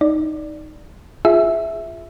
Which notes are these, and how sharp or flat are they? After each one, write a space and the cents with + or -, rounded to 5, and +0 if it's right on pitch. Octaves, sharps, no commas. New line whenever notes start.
D#4 +0 D5 +0
F4 +0 G#4 +0 E5 +0